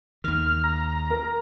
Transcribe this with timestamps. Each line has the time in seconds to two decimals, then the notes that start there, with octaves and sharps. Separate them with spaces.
0.24 D#2 D#3 F6
0.64 A#5
1.10 A#4